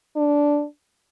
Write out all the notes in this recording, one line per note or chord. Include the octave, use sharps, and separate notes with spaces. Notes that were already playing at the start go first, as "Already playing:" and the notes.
D4